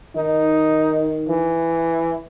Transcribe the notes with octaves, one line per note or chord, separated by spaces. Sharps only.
D#3 D#4
E3